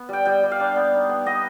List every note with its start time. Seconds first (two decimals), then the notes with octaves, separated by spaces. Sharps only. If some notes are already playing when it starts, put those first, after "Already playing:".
Already playing: B3
0.09 G3 G5
0.25 G3 G5
0.43 G3
0.52 F5
0.60 D4
0.76 B3
0.93 D#4
1.09 B3
1.26 B3 D#5